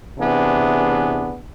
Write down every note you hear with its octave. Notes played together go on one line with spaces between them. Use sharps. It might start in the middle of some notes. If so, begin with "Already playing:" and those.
C3 E3 B3 D4 G#4